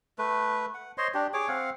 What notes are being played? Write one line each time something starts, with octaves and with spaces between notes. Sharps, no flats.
A3 B4
F#5
C5 C#5 D#5 C6
D4 G4
G#4 C#5 D6
C4 F5 F#5